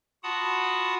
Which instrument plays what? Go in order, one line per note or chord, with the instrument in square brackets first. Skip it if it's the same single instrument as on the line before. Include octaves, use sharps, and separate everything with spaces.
[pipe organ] F4 F#4 F#5 A5 B5 D#6